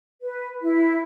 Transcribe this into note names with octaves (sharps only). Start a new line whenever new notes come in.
B4
E4